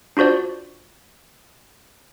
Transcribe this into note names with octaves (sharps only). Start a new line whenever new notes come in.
D4 F4 F#4 C5 D5